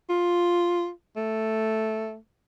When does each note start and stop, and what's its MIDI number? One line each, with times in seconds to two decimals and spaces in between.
0.09 0.90 65
1.16 2.17 57